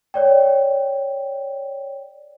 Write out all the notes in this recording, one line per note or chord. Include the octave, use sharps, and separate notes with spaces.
C#5 D5 G5